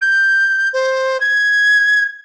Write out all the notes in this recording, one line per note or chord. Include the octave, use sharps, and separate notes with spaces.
G6
C5
G#6